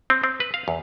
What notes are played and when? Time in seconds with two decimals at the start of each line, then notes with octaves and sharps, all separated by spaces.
0.10 C4
0.24 C4
0.40 B4
0.54 F5
0.68 E2